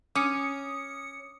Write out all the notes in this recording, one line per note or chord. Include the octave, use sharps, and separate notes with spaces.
C#4 D6 D#6 C#7